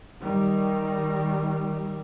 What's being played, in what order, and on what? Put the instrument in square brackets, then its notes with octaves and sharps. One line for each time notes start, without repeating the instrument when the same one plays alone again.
[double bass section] D#3 G3